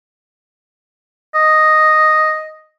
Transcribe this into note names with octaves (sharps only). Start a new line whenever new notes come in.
D#5